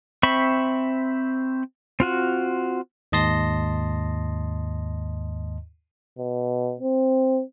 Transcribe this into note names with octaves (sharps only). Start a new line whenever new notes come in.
C4 C5 E5 B5 C#6
C4 F4 F#4
D#2 G#2 D#5 A5 C6 A#6
B2
C4